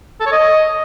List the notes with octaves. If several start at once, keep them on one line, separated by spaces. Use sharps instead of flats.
A4
C#5
D#5